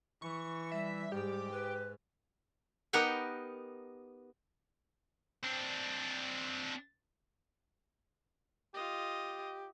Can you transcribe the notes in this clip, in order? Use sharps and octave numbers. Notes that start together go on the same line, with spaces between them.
E3 C#6
G3 E5
G#2 G4
B4
B3 D#4 G4 A#4 F#5 G5
C4 D4
F4 G4 D#5